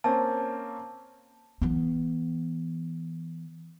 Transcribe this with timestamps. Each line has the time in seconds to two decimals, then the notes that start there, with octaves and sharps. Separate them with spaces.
0.04 A#3 C4 C#4 A5
1.61 E3 B3